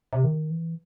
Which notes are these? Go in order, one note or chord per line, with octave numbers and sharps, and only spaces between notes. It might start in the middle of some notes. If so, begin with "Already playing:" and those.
C3
D#3
E3